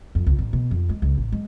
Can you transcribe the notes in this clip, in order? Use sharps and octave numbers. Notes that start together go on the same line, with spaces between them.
F2
C#2
A1
B2
F2
G#3
C#2
A1
G#3